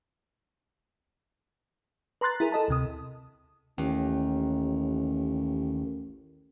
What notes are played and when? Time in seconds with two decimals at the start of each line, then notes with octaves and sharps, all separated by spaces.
2.21 B4 A#5 C6 F#6 A6
2.40 E4 G#4 A#4
2.52 A4 D#5 A5
2.68 D2 C3 D#6
3.78 A1 D#2